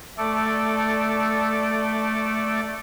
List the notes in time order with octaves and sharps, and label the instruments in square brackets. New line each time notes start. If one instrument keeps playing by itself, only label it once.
[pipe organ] A3 A4 D5